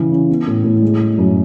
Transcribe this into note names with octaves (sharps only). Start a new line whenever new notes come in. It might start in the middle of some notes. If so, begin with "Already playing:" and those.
Already playing: C#3 E3 C#4
C#4
B3
A2
A2
G#3
G#3
F#2